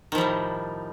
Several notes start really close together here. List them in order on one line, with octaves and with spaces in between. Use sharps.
D#3 F3 G3 A2